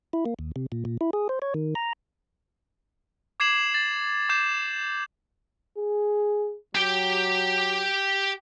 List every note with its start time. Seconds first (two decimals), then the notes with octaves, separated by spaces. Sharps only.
0.13 E4
0.26 A#3
0.39 D#2
0.56 C3
0.72 A#2
0.85 A#2
1.01 E4
1.13 G#4
1.29 C5
1.42 C#5
1.54 D#3
1.75 A#5
3.40 D6 G#6 C7 E7 F#7
3.74 A6
4.29 D6 G6 A6 C7 E7
5.78 G#4
6.75 F#3 G4 G5